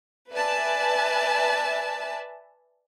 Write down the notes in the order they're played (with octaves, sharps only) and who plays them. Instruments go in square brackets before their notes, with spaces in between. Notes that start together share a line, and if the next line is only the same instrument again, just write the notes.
[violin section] B4 D5 E5 G#5 A5